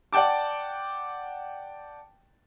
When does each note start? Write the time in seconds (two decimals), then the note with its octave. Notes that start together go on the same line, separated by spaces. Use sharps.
0.13 D5 F#5 G5 A5 D6